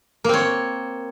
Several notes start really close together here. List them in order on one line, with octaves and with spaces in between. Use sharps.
A#3 C4 C#5